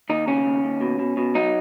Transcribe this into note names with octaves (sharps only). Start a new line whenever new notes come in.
D#2 D#4
C#3 C#4
D#2
D#2
B2
B2
B2
F#3 D#4